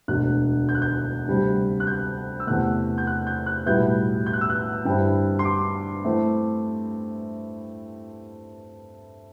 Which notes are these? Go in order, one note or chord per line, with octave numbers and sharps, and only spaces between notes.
E1 D2 D3 F#6
G6
F#6
G6
D2 C3 G3 D4
F#6
G6
E6
E2 C3 E3 A3 F#6
G6
F#6
G6
F#6
B1 A2 G3 B3 E4 G6
G6
F#6
E6
F#6
G2 D3 G3 C4 E4 G5
C6
D6
E3 A3 C4 E4